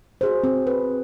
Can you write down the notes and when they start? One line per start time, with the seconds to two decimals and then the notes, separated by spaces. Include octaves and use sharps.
0.21 F#4 G#4 C5
0.44 C4
0.67 B4